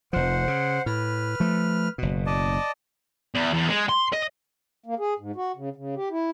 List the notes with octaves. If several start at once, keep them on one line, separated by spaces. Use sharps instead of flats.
F1 F3 C5 F#5
C#3
A2 B4 F6
F3 A3
F#1 B2
D5 D#5 A5
E2
E2
G#3
C6
D#5
A#3
G#4
G#2
F#4
C#3
C#3
G4
E4